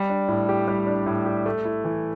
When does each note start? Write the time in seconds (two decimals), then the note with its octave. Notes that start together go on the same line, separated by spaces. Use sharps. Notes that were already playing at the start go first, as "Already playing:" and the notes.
Already playing: G3
0.09 D4
0.28 A2
0.49 G4
0.68 G3
0.87 D4
1.06 A2
1.26 G4
1.46 A3
1.65 E4
1.85 E3